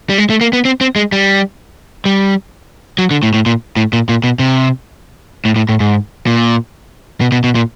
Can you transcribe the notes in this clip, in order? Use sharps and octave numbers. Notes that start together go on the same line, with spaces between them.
G3
G#3
A3
A#3
B3
C4
C4
G#3
G3
G3
F#3
D3
A2
A2
A#2
A2
A#2
A#2
B2
C3
A2
A2
A2
G#2
A#2
B2
B2
B2
A#2